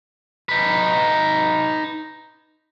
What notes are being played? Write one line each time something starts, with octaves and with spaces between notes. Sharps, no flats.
D#4 B4